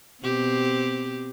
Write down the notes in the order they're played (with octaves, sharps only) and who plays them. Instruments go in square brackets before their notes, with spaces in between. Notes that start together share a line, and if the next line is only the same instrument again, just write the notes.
[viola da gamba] B2 C4 G4